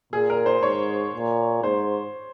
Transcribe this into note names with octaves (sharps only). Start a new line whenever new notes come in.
A#2 G#4
A#4
C5
G#2 C#5
A#2
G#2 C5